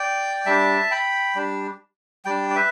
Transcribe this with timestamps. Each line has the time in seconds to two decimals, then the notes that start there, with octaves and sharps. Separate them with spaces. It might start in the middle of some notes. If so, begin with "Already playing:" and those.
Already playing: D5 G5
0.46 G3 D4 E5 A5
0.91 G5 B5
1.35 G3 D4
2.25 G3 D4 D5 G5
2.50 D5
2.55 B4 E5